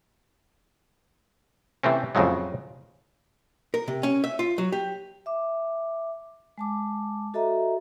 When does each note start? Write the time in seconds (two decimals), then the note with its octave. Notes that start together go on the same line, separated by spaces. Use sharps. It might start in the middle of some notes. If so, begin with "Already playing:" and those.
1.83 C3 E3 A3 C4 C#4
2.15 F2 A2 C#3 F3 F#3 G#3
3.74 A#4
3.88 C3
4.03 C#4
4.24 E5
4.39 F4
4.58 F#3
4.72 G4
5.26 E5 D6
6.58 G#3 A5 D6
7.34 F#4 A4 D#5 E5 A#5